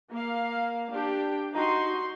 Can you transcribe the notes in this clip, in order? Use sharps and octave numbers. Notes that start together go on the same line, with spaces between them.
A#3 F5
D4 G4 G5
D#4 F#4 C6